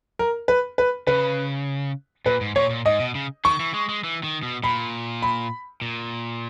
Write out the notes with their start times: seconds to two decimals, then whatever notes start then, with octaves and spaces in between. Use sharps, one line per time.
0.19 A#4
0.48 B4
0.78 B4
1.07 C#3 B4
2.26 A#2 B4
2.41 G#2
2.56 A#2 C#5
2.70 A#2
2.86 G#2 D#5
3.00 B2
3.15 C#3
3.45 D#3 C#6
3.60 E3
3.74 G#3
3.89 G#3
4.04 E3
4.23 D#3
4.43 B2
4.64 A#2 B5
5.22 B5
5.82 A#2